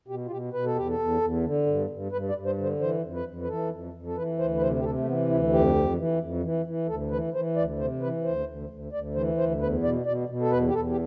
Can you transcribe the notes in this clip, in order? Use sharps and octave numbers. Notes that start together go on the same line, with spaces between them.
B2 G4
F4
B2 G4
B2 B4
A4
E2 G4
A4
E2
E2
D3
G2
G2
G2 B4
D5
G2
C5
D3
C5
E3 C5
F2
B4
F2
B4
E3 A4
F2
F2
A4
E3 B4
D2 C5
B4
C3 C5
G4
C3 A4
A3
E3 B3
D2 E4
F2 G4
F2
E3
F2
E3
E3
D2 A4
E3 B4
E3 C5
D2 D5
C3 C5
E3 B4
D2 C5
D2
D2
D2 D5
E3 C5
D2 C5
E2 B4
B2 D5
B2 D5
B2
A4
E2 B4
G4
E2 A4
G4